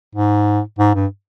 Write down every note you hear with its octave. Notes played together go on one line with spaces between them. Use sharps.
G#2
G#2
G2